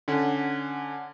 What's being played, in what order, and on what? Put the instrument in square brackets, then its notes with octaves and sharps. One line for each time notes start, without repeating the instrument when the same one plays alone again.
[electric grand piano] D3 C#4 F#5